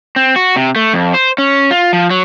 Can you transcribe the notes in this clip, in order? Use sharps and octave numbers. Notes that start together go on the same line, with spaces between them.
C4
F#4
C3
A3
F2
C5
C#4
F4
F3
F#3